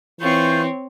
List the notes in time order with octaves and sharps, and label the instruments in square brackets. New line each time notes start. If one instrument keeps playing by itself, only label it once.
[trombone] E3 [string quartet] C4 C#5 [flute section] F4 C#6 G6